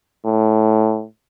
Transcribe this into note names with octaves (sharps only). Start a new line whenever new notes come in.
A2